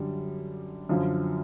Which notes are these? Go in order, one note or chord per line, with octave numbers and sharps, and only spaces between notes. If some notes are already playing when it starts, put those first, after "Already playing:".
Already playing: F#2 D3 G3
F#2 D3 F3